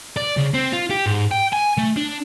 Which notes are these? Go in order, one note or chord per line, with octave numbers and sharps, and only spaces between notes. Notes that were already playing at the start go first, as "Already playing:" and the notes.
D5
C#3
C4
F4
G4
G#2
G5
G#5
A3
D4